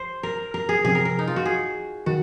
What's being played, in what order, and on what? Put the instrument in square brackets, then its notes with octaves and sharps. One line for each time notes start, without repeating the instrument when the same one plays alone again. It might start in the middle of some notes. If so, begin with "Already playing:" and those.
Already playing: [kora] C5
A#4
A#4
G#4
[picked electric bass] C3 F3 C4 [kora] G#4
[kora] A#4
A#4
D#4
F4
F#4
G#4
[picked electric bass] D#3 [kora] F#4